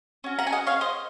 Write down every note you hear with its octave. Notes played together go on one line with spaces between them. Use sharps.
C#4 F#4
F#5 A#5
G#5
D#5 F#5
C#5 F5
C5 D#5